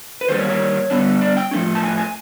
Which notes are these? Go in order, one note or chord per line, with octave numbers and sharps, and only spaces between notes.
B4
D#3 G3 A#3 C5
C#5
C#5
D3 G3 B3 D4
D5
G5
A2 F3 A3 C#4
A5
G#5
G#5